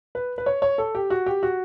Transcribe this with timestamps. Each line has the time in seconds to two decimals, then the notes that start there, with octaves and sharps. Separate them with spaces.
0.15 B4
0.38 B4
0.46 C#5
0.62 C#5
0.78 A4
0.95 G4
1.10 F#4
1.26 G4
1.43 F#4